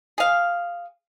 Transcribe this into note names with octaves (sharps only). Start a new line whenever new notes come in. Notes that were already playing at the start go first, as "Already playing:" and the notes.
G#4 F5